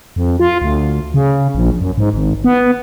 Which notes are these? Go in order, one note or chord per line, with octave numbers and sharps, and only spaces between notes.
F2
F4
D2
C#3
A#1
F#2
G#2
G#1
B3